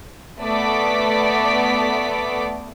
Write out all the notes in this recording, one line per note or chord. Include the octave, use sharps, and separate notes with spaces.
A3 B3 D5 D6 B6